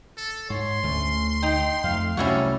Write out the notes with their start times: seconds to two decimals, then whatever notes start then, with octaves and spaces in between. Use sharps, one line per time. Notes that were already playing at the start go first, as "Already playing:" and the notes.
0.17 A4
0.50 G#2 C#5 C6
0.83 D2 D3 A3 C#4
1.43 D#4 G5
1.83 F2 G#3 A3 F5
2.17 C2 F#3 G3 A3 C#4 E4 F#4 A4